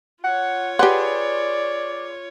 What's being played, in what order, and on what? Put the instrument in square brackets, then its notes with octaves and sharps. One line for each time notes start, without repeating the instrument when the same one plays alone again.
[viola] F4 C#5 [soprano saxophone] F#5
[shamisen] G4 F#5 [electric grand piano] G#4 B4 C6 [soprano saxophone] D5